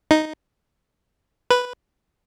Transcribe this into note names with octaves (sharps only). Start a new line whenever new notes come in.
D#4
B4